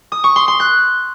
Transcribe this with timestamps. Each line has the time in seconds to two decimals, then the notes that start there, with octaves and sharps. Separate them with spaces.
0.12 D#6
0.24 C#6
0.36 C6
0.48 C6
0.60 F#6